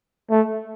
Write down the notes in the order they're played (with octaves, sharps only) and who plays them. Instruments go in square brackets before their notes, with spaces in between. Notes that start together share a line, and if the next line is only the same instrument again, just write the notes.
[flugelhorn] A3